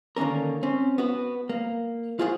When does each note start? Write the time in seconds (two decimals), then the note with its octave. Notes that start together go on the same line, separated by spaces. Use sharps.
0.16 D3 D#3 A#3 C#4 A#4
0.63 C4 C#4
0.98 B3 F#4
1.49 A#3
2.19 F4 F#4 G#4 C5 F#5